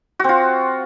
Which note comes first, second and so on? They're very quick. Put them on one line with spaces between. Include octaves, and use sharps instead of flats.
F#4 C4 F4